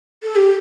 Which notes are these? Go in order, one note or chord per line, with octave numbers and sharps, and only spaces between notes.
A4
G4